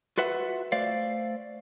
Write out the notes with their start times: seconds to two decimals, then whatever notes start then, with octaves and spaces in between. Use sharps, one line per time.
0.18 F4 F#4 B4 E5 F#5
0.72 A3 C5 D5 F5